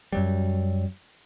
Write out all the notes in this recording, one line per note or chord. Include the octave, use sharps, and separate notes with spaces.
F#2 F#3 G3